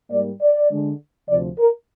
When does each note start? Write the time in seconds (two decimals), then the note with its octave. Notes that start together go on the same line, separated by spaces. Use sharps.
0.10 G#2 G3 A#3 D5
0.41 D5
0.71 D3 G#3 D4
1.28 D2 C3 F3 D5
1.59 A#4